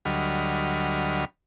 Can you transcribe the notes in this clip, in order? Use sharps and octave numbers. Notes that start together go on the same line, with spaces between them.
D2 F#3 G3 D#5 B5 F6